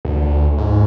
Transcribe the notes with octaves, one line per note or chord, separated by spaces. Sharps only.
D2
G#2